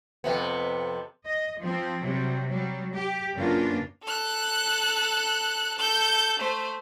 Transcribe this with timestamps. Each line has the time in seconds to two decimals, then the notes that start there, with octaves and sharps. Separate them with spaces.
0.24 F2 C3 B3
1.26 D#5
1.60 F3 C4
2.03 C3 F#3 G3
2.48 F#3 G3
2.94 G4
3.35 F#2 C#3 A#3 B3 D4 F4
4.04 A4 F#6
5.78 A4 G6
6.40 A3 C5